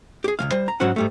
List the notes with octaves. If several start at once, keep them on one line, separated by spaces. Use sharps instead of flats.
G4 G#4
C#2 E3 F5
G3 C5
A#5
G#2 F#3 C#4 F#4 C5 F#5
G#2 G3 A3